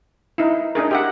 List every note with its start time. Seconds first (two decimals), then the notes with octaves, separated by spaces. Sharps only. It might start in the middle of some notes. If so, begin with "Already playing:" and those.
0.38 D#4 E4
0.75 D4 D#4 G#4 A#4
0.91 G4 E5 F#5